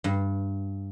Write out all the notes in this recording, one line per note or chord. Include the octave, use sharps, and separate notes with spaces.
G2